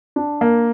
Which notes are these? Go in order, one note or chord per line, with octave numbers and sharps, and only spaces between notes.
D4
A#3